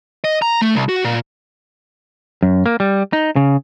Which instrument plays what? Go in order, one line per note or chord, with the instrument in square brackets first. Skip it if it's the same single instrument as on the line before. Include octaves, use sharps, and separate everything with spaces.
[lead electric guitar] D#5
A#5
A3
C2
F#4
A#2
[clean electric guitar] F#2
A#3
G3
D#4
C#3